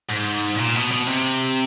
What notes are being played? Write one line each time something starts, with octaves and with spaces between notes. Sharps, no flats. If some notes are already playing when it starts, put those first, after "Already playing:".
G#2
A#2
B2
B2
C3